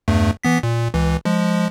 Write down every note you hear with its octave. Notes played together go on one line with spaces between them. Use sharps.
E2 G2 A3
E3 B3 B6
A#2
C#2 E3
F3 G#3